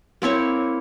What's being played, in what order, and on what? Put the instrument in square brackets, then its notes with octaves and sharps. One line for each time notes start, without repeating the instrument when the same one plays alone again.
[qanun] A#3 C4 E4 C#5